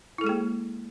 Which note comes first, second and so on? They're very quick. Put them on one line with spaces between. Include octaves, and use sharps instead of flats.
E4 A4 G#3 G#4 A#3